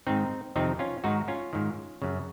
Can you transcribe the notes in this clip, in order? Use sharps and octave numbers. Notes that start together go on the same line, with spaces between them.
G#2 D#3 C4 D#4
F2 C3 D#3 C4 D#4
C#4 F4
G#2 D#3 D#4 F#4
C#4 F4
G#2 D#3
F#2 C#3